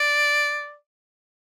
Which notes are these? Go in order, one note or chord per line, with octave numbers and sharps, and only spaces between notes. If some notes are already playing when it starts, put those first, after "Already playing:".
Already playing: D5